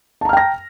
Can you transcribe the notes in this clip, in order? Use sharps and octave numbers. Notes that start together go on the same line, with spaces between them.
G5 A5 A#5 F6 A#6